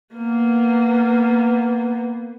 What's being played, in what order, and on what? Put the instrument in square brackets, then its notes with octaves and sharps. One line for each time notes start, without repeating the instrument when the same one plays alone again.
[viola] A#3 B3